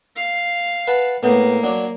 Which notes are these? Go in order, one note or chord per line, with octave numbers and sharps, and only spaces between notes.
F5
B4 F#5 A5
A2 A#3 B3
F#3 D4